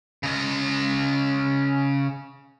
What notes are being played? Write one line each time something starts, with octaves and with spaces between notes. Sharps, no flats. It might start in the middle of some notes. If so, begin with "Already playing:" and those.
C#3 D#5